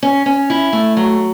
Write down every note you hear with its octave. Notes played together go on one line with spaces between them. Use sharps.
C#4
C#4
E4
A3
F#3